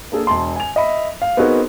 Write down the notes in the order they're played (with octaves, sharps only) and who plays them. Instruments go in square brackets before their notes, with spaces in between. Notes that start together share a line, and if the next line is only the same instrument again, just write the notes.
[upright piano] A#3 D4 G#4 A4
E1 A5 C6
G#5 F7
D#5 E5 B5
F5
B3 C4 D#4 F#4 G#4 A#4